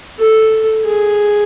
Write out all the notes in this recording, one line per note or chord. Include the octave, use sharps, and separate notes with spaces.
A4
G#4